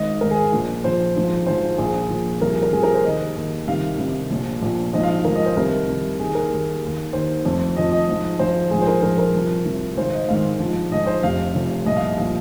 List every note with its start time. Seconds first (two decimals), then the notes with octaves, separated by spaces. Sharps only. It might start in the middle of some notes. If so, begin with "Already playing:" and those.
Already playing: G#1 G#2 D#3 D#5
0.21 G#1 G#2 D#3 A#4
0.31 G#4
0.52 A#1 A#2 F3
0.84 A#1 A#2 F3 C5
1.15 G#1 G#2 F3
1.47 G#1 G#2 F3 C5
1.78 A#1 A#2 F3 G#4
2.10 A#1 A#2 F3
2.41 C2 C3 F3 A#4
2.52 G#4
2.62 A#4
2.73 C2 C3 F3 G#4
2.83 A#4
2.94 C5
3.04 D#2 D#3 D#5
3.35 D#2 D#3
3.67 C2 C3 D#3 F5
3.98 C2 C3 D#3
4.30 A#1 A#2 F3
4.61 A#1 A#2 F3
4.93 G#1 G#2 F3 D#5
5.03 F5
5.24 G#1 G#2 F3 A#4
5.35 D#5
5.46 C5
5.57 C2 C3 D#3 A#4
5.87 C2 C3 D#3
6.19 D#2 D#3 G#4
6.35 A#4
6.51 D#2 D#3
6.82 D#2 D#3
7.13 D#2 D#3 C5
7.45 F1 F2 F3
7.76 F1 F2 F3 D#5
7.92 D#5
8.08 G#1 G#2 F3
8.39 G#1 G#2 F3 C5
8.71 A#1 G#2 F3 G#4
8.82 C5
8.87 A#4
9.03 A#1 G#2 F3 A#4
9.18 A#4
9.34 C2 C3 F3
9.65 C2 C3 F3
9.97 G#1 G#2 D#3 C5
10.13 D#5
10.28 G#1 G#2 D#3 F5
10.60 A#1 G#2 F3
10.91 A#1 G#2 F3 D#5
11.07 C5
11.23 F1 F2 C3 F5
11.55 F1 F2 C3
11.86 C2 A#2 F3 D#5
11.97 F5
12.07 D#5
12.18 A#2 F3 F5